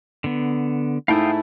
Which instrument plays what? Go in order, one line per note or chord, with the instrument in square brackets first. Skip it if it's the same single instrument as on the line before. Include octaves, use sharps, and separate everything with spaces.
[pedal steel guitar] D3 B3
[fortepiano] G#2 A3 E4 [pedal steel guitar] F5 G5 D#6